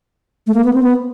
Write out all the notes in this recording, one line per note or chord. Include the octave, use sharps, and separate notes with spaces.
A3
A#3
B3
C4
B3